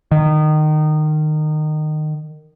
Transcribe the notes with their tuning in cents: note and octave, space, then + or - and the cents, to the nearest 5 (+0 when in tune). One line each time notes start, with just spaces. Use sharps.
D#3 -20